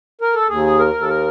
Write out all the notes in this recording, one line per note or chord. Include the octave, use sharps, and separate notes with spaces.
A#4
A4
D#2 G#4
A#4
D#2
A4
A#4